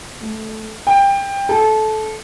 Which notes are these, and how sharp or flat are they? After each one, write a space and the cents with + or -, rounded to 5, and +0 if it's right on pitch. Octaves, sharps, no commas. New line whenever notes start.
A3 -5
G5 +20
A4 -20